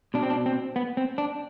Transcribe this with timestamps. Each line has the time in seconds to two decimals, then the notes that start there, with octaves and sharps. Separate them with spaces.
0.14 B2 D4
0.23 C4
0.30 D4
0.46 C4
0.76 B3
0.97 C4
1.18 D4